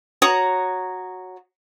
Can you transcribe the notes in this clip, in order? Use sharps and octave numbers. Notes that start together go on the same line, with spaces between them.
F#4 C#5 A#5 D#6